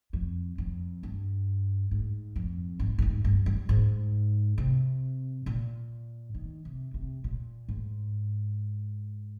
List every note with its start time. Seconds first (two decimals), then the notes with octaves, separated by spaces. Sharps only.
0.13 F2
0.58 F2
1.03 G2
1.91 G#2
2.36 F2
2.79 G#2
2.98 G2
3.02 G#2
3.24 G2
3.46 G2
3.69 G#2
4.58 C3
5.46 A#2
6.34 D#3
6.65 C3
6.94 C3
7.24 A#2
7.68 G#2